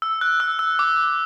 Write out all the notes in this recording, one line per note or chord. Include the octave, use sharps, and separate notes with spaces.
E6
F#6
E6
E6
D6